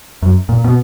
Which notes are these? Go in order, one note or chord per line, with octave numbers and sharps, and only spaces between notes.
F#2
A#2
B2